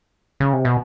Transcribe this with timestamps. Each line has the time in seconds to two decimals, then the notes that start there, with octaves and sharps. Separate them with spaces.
0.40 C#3
0.53 C3
0.65 B2